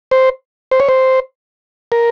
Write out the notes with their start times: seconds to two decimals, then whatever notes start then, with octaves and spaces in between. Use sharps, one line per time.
0.11 C5
0.71 C5
0.80 C#5
0.89 C5
1.92 A#4